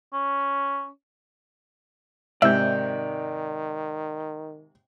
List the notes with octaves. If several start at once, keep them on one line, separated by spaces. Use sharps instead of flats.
C#4
G#2 C3 D#3 D5 E5 G6